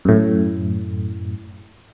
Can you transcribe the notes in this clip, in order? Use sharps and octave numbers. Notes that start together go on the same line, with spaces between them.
F#2 A2